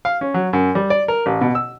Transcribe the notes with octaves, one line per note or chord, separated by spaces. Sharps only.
F5
C#4
F#3
F#2
G3
D5
A#4
A1
B2
E6